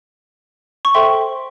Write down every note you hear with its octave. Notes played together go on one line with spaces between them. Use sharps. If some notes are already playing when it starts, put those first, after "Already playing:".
C#6
A4 C5 E5 G5 C6